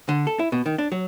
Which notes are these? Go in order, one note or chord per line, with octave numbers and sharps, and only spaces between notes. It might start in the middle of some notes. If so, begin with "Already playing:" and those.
D3
A4
E4
B2
D#3
D4
F#3